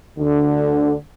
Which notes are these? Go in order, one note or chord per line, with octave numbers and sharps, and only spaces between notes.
D2 D3